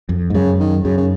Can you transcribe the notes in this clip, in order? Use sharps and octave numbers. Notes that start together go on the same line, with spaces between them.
F2
G#2
F#2 C#3
D#3
F#2 C#3
C#3